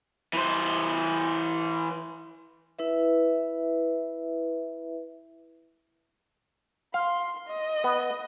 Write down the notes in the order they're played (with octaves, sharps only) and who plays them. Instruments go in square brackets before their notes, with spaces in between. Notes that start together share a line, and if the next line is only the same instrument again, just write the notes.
[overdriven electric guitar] E3 C5
[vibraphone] E4 B4 E5
[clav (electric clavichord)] F5 [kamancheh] C6
[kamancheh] D#5
[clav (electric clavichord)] B3